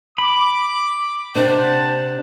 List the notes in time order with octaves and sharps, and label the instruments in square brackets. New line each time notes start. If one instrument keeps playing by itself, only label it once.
[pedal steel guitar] B5 [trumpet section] D6
[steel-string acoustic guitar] C3 D4 [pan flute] C5 [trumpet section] F#5 A5